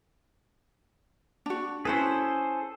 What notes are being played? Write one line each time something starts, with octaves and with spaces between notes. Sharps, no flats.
D4 F#4
C#4 E4 G#4 A4 B4 C5